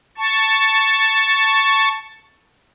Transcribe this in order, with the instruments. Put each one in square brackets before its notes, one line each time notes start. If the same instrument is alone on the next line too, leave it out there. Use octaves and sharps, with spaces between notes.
[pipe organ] A5 C#6